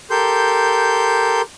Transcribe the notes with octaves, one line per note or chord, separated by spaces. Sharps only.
G4 A4 A#4 C6 G6